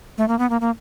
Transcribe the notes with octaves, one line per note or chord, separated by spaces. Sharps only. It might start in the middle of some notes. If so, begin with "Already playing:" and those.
A3
A#3
B3
A#3
A#3